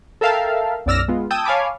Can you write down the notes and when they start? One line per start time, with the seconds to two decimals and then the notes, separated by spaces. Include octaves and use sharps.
0.21 A4 A#4 E5 F5 G5 A5
0.86 B1 F#2 D5 E6 F6 A#6
1.08 G#3 B3 F4
1.31 G5 A5 D#6 E6 G6 G#6
1.45 C#5 F5 G#5 A5 B5 D6